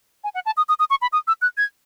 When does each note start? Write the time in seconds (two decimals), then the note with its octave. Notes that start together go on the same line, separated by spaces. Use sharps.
0.24 G#5
0.34 F#5
0.46 A5
0.57 D#6
0.69 D#6
0.79 D#6
0.90 C#6
1.02 B5
1.12 D#6
1.27 E6
1.41 F#6
1.57 G#6